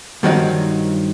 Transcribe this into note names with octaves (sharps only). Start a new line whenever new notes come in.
G2 D#3 F3 F#3 D#4